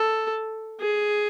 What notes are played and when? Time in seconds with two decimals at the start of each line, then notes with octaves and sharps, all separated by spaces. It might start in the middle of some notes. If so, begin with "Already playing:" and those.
Already playing: A4
0.80 G#4